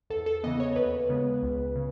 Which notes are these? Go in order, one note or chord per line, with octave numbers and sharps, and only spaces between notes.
E2 A4
A4
C#3 E3 B3 D#5
C#5
D#2 B4
C#3 G#3 B3
C#2
C#3